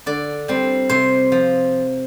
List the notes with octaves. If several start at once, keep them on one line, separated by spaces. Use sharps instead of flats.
D3 D5
G3 C4
C3 C5
F3